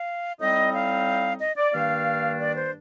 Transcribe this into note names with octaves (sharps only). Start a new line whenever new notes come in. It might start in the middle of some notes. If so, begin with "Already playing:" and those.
Already playing: F5
A2 G3 C4 D#4 D#5
F5
D#5
D5
G2 D#3 A#3 D4 F5
D5
C5